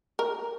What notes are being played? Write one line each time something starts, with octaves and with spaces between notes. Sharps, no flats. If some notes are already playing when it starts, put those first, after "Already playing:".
A#4